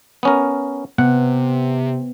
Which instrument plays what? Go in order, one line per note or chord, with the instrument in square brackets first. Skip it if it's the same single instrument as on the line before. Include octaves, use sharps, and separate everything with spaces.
[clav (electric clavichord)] B3 C#4 A#4
[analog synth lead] C3 [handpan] B3 [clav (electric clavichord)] F#5